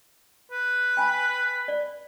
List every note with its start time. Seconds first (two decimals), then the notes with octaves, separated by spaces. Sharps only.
0.51 B4
0.97 G5 G#5 B5
1.68 D5